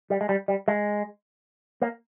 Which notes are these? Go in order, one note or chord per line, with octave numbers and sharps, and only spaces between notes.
G3
G#3
G3
G3
G#3
A#3